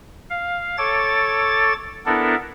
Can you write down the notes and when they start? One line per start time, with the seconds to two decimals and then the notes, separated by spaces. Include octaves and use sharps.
0.30 F5
0.77 A4 C#5 D6 A6
2.06 B3 D4 E4 A4 A#4